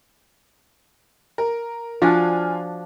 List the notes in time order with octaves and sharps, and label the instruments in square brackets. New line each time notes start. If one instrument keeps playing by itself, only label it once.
[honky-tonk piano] A#4
[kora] F3 D4 F#4 [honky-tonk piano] F4 G#5